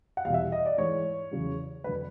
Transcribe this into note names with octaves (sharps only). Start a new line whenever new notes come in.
F#5
E2 B2 G3 F5
E5
F5
D#5
D5
G#2 E3 G#3 C#5
E2 C#3 F#3
F2 D3 F#3 B4